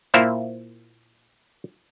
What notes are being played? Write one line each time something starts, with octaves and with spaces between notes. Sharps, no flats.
A#2 A#3 E4 C5 E5 F5